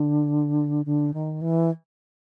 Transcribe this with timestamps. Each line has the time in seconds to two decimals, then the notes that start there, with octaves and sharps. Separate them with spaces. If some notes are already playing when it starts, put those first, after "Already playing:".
Already playing: D3
0.86 D3
1.14 D#3
1.41 E3